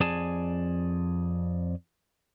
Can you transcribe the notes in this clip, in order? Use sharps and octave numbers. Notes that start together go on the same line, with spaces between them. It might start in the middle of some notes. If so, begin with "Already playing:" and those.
F2 G#4 D5 G#5 A5